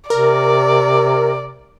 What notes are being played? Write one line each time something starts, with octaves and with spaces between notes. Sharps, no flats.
C3 A#4 D5